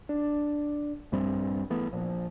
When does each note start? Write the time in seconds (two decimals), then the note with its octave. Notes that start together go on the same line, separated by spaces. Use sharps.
0.09 D4
1.12 A#1 G2 G3 C4
1.70 E3 A3 B3
1.93 A#2 F3